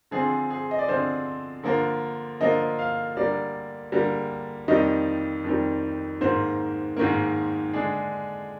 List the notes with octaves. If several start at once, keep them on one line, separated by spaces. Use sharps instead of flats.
D3 F3 C4 G#4
G#4
D#5
D5
D3 F3 C4 C5
D3 F3 A#3
D3 F3 A#3 D#5
F5
D3 G3 A#3 D5
D3 G3 A#3
F2 D#3 G3 D#5
F2 D#3 G3
G#2 D#3 A#3 C5
G#2 D#3 A#3
D3 G#3 D4 G#4